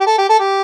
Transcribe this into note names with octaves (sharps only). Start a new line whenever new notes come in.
G4
A4
G4
A4
G4